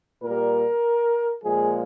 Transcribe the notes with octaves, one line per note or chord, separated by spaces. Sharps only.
A#2 G3 A#4
A#2 F3 G#3 G#4